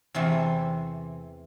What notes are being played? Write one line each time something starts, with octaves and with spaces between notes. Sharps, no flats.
E2 C3 E3 A3 C4